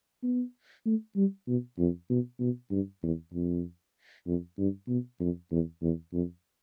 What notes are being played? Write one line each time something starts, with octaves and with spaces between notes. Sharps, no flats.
B3
A3
G3
B2
F2
B2
B2
G2
E2
F2
F2
G2
B2
F2
E2
E2
F2